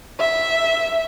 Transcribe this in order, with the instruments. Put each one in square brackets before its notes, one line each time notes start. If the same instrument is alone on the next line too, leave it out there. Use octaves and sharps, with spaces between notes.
[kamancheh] E5